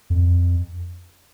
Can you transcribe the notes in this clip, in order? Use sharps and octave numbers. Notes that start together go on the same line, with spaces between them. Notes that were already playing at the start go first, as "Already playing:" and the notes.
F2